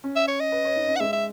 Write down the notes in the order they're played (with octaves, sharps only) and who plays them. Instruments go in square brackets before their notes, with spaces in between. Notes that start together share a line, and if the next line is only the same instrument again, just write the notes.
[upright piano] C#4
[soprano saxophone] E5
C#5
D#5
[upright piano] B4
C#5
D#4
C#4
[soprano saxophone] F#5
[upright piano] G#3 [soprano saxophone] E5
[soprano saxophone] E5